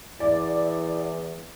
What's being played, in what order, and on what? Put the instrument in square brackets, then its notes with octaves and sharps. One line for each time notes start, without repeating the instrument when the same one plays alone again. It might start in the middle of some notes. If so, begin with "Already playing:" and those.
[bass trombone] E2 [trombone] E4 [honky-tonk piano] D5